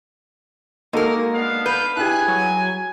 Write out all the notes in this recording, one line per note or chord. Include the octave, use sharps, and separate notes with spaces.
G#3 A#3 D#4 F#4 A4 A#4
B3 D4 F5
B4 G6
E4 G4 G#4 G#5 F#6
F#3